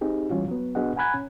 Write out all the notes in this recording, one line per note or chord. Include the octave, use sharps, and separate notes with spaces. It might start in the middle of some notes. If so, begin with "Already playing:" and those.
C4 D#4 G4 G#4
E3 G3 C#4 F4 F#4
F#3 B3
B3 D4 F#4 G#4 D#5 F#5
F#5 G#5 A#5 B5 F#6 G#6
C#4